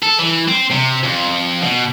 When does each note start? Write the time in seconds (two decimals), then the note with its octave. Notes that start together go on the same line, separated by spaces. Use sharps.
0.03 A4
0.19 E3
0.48 C4
0.71 C3
1.04 F2
1.62 B2